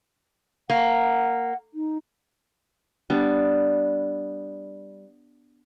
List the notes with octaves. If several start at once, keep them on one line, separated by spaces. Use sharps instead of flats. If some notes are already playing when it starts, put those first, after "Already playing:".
A#3 F#5
D#4
G3 B3 D4